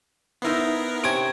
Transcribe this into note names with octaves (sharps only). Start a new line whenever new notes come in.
B3 D#4 E4 A#4 C5
C3 C#4 G5 D#6 G#6 D7